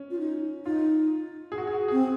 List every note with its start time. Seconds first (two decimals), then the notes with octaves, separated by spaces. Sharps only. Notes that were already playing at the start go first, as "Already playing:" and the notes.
Already playing: C#4
0.11 F4
0.19 D#4
0.65 D#4 F4
1.52 G#4
1.58 F#4
1.67 G#4
1.73 F#4
1.88 G#4
1.92 C4